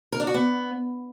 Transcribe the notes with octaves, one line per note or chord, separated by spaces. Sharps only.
A#4
D4
F#4
B3